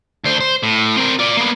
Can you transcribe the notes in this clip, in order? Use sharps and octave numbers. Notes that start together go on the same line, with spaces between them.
D2 C5
C5
A2
C4 A#4
F4 D5
A#3 B3